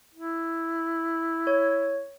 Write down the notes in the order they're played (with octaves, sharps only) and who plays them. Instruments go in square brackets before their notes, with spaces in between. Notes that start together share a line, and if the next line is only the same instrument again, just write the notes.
[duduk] E4
[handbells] C#5